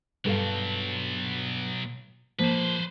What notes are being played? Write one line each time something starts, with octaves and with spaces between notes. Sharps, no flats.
G2 B2 F#3 A4 F5
F3 A#3 B4 C5